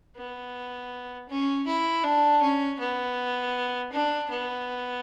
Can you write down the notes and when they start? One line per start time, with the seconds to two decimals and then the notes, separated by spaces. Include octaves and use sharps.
0.16 B3
1.29 C#4
1.67 E4
2.04 D4
2.42 C#4
2.79 B3
3.92 D4
4.30 B3